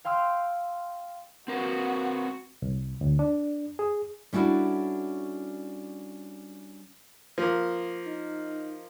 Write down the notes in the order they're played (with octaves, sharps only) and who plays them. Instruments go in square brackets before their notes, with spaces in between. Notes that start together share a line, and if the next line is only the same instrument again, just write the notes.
[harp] F5 G5 C6 E6 F6 G6
[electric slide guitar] C4 A#4 B4 [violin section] F#4
[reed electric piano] C2
D2
D4
G#4
[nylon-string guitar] G3 C#4 D4 E4 F#4 A4
[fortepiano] F3 A#3
[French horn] D#4